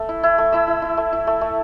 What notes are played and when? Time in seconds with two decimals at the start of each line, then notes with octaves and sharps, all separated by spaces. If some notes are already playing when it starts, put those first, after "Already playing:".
Already playing: A3
0.09 E4
0.23 E4
0.38 A3
0.52 E4 E5
0.68 E4
0.82 E4
0.97 A3
1.13 E4
1.27 A3
1.41 A3